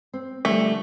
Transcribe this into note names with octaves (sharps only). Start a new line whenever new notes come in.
C4
D3 F3 G3 A3